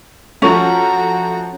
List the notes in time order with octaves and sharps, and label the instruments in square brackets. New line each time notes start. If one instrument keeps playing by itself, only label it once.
[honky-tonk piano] F3 A3 A4 [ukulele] C#4 [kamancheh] F#4 A#5